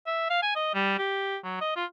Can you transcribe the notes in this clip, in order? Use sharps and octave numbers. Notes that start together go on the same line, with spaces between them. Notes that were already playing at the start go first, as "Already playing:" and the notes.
E5
F5
G#5
D#5
G3
G4
F#3
D#5
F4